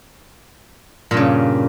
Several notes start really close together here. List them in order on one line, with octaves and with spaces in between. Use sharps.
A#2 G2 C#3